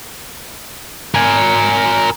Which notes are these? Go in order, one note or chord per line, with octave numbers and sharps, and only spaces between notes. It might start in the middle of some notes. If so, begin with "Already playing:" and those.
A#4 G#5